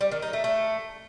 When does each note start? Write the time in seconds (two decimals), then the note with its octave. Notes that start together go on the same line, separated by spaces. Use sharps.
0.01 G3
0.11 D#3
0.22 D#4
0.33 A3
0.44 A3